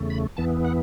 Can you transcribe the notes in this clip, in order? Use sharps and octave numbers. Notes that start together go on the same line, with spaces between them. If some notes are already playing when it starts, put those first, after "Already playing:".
Already playing: E2 C#3 A3
B5
E2 E3 B3 A5
F#5